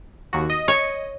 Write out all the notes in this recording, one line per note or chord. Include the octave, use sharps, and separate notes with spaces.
D#2 F#4
D#5
C#5